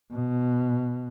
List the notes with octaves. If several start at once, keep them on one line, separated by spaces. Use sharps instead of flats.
B2